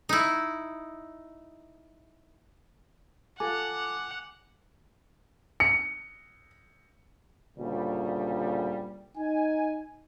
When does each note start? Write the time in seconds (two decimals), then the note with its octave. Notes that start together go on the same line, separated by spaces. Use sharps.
0.09 D#4 E4
3.40 F4 A4 F#5 G#5 D6
5.60 C#7
7.58 D2 A#2 C#3 G3
9.18 D#4 G#5